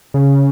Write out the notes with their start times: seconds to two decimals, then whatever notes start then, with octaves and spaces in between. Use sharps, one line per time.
0.14 C#3